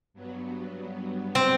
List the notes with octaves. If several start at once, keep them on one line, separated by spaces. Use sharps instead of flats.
G2 F#3 B3
C4